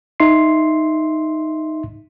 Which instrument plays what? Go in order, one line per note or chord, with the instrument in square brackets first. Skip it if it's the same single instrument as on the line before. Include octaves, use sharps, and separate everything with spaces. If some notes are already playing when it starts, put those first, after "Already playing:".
[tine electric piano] D#4 E5 C6 C7